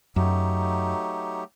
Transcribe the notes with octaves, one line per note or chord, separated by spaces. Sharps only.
F#2 F#3 A3 D#4 G4